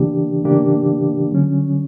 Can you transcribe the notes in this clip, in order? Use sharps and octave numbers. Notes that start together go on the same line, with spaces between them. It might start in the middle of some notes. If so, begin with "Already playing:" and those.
Already playing: C#3 E3 A#3 D4 G4
C#3 E3 A#3 D4 G4
D3 F#3 C#4